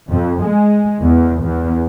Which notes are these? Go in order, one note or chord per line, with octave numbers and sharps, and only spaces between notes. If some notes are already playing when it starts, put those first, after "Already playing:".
F2
G#3
E2
E2